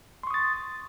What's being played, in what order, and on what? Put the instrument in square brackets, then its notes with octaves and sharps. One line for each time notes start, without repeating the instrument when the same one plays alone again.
[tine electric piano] C6
C#6
D#6
A6